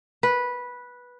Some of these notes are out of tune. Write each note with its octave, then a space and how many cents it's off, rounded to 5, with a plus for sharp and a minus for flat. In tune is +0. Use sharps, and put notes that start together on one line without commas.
B4 -10